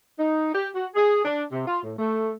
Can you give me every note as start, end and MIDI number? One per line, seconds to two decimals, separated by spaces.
0.18 0.53 63
0.54 0.68 67
0.74 0.87 66
0.95 1.21 68
1.25 1.42 62
1.51 1.64 48
1.66 1.78 65
1.83 1.93 45
1.98 2.32 57